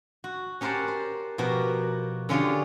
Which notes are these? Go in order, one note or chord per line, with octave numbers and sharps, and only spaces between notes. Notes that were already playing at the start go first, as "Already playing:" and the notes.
F#4
C#4 G4 A#4 C5 F#5 A5
C5
B2 F3 F#4 G4 A#4
D3 C#4 F4 G4 G#4